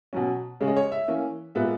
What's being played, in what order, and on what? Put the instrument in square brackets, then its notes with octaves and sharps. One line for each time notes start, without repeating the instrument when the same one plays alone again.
[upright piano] B2 F#3 C#4
C#3 G#3 C#4
D#5
C#5
E5
E3 A#3 C#4
A#2 G#3 B3 E5